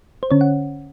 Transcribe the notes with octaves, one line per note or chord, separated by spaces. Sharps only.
C5
D3 C#4 C#5
F#5